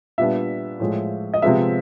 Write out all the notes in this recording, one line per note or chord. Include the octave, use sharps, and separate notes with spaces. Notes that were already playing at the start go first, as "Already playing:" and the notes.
A#2 G3 B3 D4 E5
A2 F3 G#3
D#5
C3 F3 G#3 B3 E5